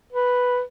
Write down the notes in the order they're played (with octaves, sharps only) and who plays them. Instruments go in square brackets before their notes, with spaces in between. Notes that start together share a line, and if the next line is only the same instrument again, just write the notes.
[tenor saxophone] B4